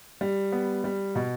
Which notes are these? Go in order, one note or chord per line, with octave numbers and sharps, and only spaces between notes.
G3
B3
G3
B2